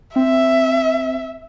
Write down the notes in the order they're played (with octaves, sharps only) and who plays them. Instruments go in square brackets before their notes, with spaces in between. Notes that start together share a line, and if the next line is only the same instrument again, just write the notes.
[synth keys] C4 [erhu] E5